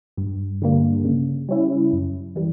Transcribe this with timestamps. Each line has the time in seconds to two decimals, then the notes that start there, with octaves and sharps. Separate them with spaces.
0.17 G2
0.62 D3 G3 A#3
1.05 C#3
1.49 G3 C#4 E4
1.93 F#2
2.36 E3 G3